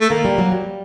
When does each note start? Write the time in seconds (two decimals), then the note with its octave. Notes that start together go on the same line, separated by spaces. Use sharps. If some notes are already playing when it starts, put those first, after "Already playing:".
0.01 A3
0.10 D#3 A#3
0.25 G3
0.38 F#3
0.52 G3